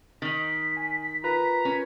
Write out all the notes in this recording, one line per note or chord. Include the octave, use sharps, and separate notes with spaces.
D#3 D#4 B6
G#5
F4 A#4 B4 A#5
C#4